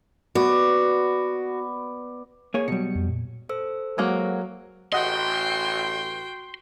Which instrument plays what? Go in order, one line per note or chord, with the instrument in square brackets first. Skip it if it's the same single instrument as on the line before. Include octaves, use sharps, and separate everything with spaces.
[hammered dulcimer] B3 D5 [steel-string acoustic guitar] F#4
[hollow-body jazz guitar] A#3 G#4 C#5
[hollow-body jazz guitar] B2 G3 [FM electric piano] F#3 C#7
[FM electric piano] F2
A#2
[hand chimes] A4 C5 E6
[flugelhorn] F#3 [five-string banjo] G#3 A#3 F#4
[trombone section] A1 [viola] F#4 G5 [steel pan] D#5 F#5 [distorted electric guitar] C6